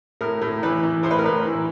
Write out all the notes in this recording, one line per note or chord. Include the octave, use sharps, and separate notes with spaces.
A2 A#4
A2
E3 B4
E3
A2 C5
B4
A#4
A2 B4
E3